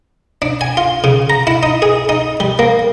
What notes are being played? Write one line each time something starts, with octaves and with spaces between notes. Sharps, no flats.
D4
G#5
F4
C#3
A#5
E4
D#4
G#4
D#4
G3
A#3